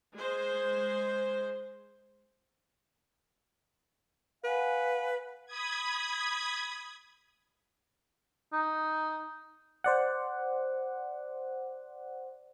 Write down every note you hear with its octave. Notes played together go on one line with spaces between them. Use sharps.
G#3 C5
B4 F5 F#5 G#5
B5 D#6 G#6
D#4
C5 D5 F#5